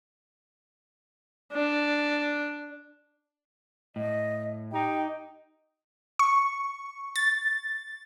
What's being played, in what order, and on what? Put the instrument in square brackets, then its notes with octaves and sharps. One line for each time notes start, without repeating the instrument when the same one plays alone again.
[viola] D4
[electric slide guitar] A2 [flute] D#5
[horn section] D#4 G4 [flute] G5
[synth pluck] C#6
A6